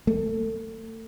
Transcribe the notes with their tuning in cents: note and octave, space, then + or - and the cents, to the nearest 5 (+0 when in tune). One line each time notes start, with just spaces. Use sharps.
A3 +30